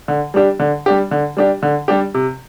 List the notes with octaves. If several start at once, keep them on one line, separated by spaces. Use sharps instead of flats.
D3
G3 D4 G4
D3
G3 D4 G4
D3
G3 D4 G4
D3
G3 D4 G4
C3